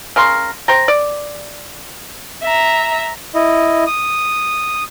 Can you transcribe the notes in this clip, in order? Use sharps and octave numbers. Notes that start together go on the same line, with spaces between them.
C#3 A#4 C6
C5 G5 A#5
D5
E5 A#5
E4 D#5
D#6